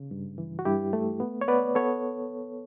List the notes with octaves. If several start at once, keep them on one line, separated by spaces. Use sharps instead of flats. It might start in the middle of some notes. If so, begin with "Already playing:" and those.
Already playing: C#3
G2
E3
F#4
G2 E4 G4
A3
B3
C#5
B3 B4 D5
B3 A4 C#5